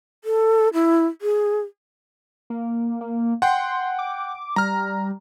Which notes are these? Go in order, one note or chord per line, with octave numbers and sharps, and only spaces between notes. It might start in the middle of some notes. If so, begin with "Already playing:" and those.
A4
E4
G#4
A#3
A#3
F#5 G5 C6
D6
G3 A#5 F6